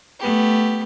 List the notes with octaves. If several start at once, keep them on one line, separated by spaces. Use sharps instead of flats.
A3 B3 G4